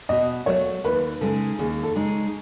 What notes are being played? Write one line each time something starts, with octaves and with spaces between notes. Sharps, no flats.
B2 D#5
F#3 A3 C#5
D#2 B4
C#3 G#3 D#4 A4
D#2 G#4
A4
C#3 G#3 D#4